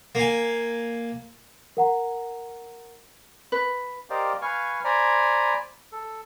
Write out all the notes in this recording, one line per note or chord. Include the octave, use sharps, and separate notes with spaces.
A#3 G#5
A#4 F#5 A#5
B4
G4 A#4 C5 D5 D#5 F5
B4 F5 G#5 C#6
C5 D5 G#5 A#5 B5
A4